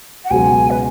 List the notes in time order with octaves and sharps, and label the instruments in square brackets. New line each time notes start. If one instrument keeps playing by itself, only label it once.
[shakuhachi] F#5
[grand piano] C#2 B2 F#3 [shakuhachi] G#5
[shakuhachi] B4